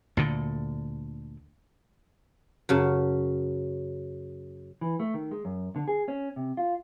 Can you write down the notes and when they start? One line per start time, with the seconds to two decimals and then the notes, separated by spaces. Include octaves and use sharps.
0.17 D2 A#2 D3
2.69 F#2 C#3 A5
4.81 E3
5.00 A3
5.14 D#3
5.31 G#3
5.45 F#2
5.76 D3
5.88 G#4
6.08 C#4
6.36 C3
6.57 F4